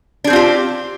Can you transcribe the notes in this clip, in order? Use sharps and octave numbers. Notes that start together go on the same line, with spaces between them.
C4 D4 F4 G4 G#4